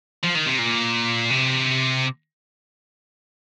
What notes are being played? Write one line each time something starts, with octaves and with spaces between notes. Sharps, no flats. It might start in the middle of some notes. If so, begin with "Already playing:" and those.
F3
D#3
C3
A#2
C3